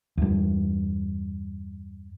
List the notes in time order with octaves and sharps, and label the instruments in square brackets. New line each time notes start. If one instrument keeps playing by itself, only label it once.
[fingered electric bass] E2 G2